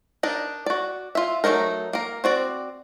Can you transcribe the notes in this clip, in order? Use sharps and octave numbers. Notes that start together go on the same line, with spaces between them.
D4 D#4 A#4
F#4 D5
F4 E5
F#3 G#3 A3 D#4 A#4
A#3 A#4
C4 F#4 D5